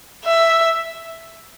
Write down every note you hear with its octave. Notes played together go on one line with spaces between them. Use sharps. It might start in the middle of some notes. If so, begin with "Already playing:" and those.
E5